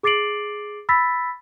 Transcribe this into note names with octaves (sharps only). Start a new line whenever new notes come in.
G#4 D6 A6 C7 D7 F#7
B5 E6 A6 B6